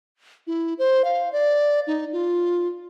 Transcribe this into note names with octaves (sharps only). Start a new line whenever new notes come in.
E4
C5
F5
D5
D#4
F4